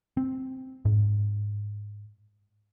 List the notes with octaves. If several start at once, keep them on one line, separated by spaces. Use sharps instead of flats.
C4
G#2